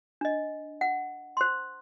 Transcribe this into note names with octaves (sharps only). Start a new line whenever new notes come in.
D4 D#5
F#5
C5 C6